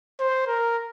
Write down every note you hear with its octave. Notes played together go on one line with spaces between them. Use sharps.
C5
A#4